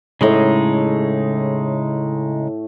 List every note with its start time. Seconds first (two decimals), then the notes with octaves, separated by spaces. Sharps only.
0.21 A2 C#3 G#3 D#4 C#5